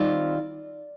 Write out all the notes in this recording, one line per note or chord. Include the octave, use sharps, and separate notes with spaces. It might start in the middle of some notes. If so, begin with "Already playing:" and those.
Already playing: D#3 G3 C4 F4 D5